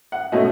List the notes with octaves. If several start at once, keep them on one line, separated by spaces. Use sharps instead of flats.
F#5
B2 A3 C#4 D#5